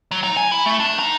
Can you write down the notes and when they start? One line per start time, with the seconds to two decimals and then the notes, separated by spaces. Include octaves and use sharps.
0.11 F#3
0.23 D#4
0.37 G#5
0.52 E4
0.66 A3
0.80 D4
0.99 D#4